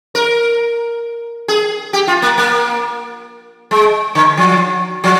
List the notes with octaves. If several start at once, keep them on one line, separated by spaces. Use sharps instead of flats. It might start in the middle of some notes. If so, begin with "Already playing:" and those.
A#4
G#4
G4
F4
A#3
A#3
G#3
D3
F3
F3